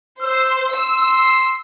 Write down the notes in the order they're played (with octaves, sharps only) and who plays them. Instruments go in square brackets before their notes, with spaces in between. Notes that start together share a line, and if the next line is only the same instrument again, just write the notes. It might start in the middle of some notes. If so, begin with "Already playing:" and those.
[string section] C5 [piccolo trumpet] E6
[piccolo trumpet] C6 [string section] E6